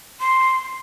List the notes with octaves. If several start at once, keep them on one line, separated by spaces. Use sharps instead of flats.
C6